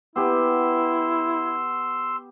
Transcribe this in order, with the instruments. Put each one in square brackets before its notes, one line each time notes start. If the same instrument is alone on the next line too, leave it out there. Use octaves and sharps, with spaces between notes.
[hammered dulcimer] B3 G4 B4 [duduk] E4 [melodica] C6 E6